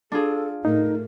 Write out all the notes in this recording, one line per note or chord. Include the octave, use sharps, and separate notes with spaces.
D4 F4 G#4 A4
A2 A3 D#4 A#4